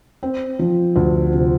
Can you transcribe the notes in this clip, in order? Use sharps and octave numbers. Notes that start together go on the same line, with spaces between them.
C4
F3
D2
C3